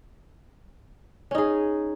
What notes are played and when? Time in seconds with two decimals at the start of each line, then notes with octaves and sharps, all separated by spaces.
1.31 C#4
1.35 D#4
1.38 G#4